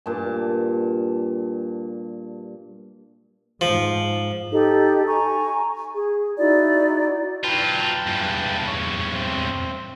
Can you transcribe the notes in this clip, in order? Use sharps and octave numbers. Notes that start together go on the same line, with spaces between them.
G2 A#2 A5
G#2 F3
D#4 G4 A4
G#5 A#5 C#6
G#4
D#4 E4 F#4 D5
F#3 F4 B4 G5 A5
E2 G2
C#5
C4